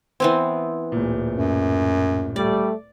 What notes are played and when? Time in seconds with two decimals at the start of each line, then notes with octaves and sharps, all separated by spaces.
0.20 E3 B3 C4
0.92 D1 A#2
1.34 F#2
2.36 G3 A3 D5